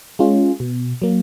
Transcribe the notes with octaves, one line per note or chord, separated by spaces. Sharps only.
G#3 C#4 F4
B2
F#3 A#3